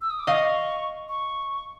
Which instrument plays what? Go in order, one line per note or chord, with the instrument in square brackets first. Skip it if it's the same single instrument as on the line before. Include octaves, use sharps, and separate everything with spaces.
[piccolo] E6
D#6
D6
[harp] D#5 F5 [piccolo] C#6
[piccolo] C#6